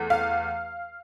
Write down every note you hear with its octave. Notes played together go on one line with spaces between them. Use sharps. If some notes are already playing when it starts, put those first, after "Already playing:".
Already playing: E2 A3
F5